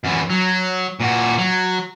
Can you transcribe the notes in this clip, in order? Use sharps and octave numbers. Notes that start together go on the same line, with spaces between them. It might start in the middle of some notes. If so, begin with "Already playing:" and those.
F#2 E3
F#3
A#2 F#4
F#3